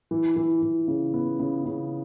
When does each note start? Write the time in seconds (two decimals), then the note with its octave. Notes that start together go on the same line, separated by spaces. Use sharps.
0.11 E3
0.36 E3
0.62 E3
0.88 C#3
1.14 B3
1.39 C#3
1.65 C#3